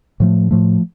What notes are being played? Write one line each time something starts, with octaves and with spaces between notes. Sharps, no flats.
A2 F3 A3
A2 F3 A3